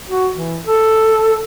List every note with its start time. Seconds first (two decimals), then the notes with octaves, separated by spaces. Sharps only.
0.10 F#4
0.34 E3
0.66 A4